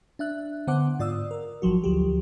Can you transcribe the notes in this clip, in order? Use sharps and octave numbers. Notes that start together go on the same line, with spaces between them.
D4 E5 F#6
D3 B3 C5 F#5 D6 F#6
G#2 F4 D5 D#6 E6
A#4
G#1 F3 F#3 F#4
D2 F3 F#3 G4